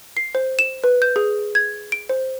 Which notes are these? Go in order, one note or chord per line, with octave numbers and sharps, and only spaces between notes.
C7
C5
E7
B4
G6
G#4
G#6
D7
C5